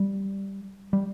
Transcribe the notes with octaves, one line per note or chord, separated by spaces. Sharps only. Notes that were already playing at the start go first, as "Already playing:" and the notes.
Already playing: G3
G3